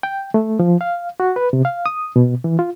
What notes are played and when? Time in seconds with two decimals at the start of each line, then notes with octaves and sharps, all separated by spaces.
0.03 G5
0.34 A3
0.59 F3
0.81 F5
1.20 F#4
1.36 B4
1.53 C3
1.65 F5
1.86 D#6
2.16 B2
2.44 E3
2.59 F4